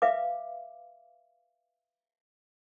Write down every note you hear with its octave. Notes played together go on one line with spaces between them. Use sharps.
B4 E5 F5 D6